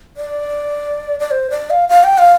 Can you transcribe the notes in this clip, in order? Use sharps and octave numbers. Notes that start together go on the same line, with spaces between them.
D5
D5
C5
D5
F5
F5
G5
F5